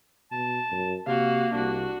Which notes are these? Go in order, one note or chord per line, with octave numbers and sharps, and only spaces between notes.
B2 A5
F#2
C3 A#3 F#4 F5
C2 D4 F#4